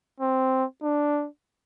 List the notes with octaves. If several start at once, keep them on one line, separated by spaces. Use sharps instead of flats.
C4
D4